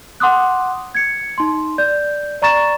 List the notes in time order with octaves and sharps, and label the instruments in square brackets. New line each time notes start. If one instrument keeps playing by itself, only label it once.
[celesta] F#5 C6 D6 D#6 F#6
G#6 C#7
D#4 C6
D5 G6
D5 A#5 C#6 A6 E7